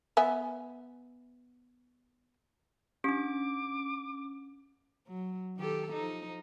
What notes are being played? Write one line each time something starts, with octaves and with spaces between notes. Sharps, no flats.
B3 E5 G#5
C#4 D4 G4 D6
F#3
D#3 G4 A4
F3 D#4